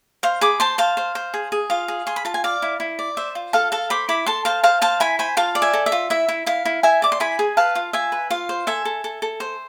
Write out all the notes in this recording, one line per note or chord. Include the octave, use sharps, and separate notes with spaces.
C5 F5
G#4 B5 D6
C5 A5 C6
C5 F5 A5
C5
C5
G#4
G#4
F4 F5
G#4
G#4 C6
B5
F4 A5
G#5
D5 F5
E4
E4
D5
C5 E5
F4
A4 F5 A5
A4 F5 A5
C5 B5 D6
E4 B5 D6
A4 A5 C6
C5 F5 A5
C5 F5 A5
C5 F5 A5
E4 G#5 B5
C5 G#5 B5
F4 F5 A5
D5
E5 G#5
A4
E5
F4
E4 E5
E4
E4 F5
E4
E4 E5 G#5
D5 D6
C6
E4 G#5 B5
G#4
B4 F5 A5
F4
F4 E5 G#5
B4
F4 F5
C5
A4 E5 G#5
A4
A4
A4
C5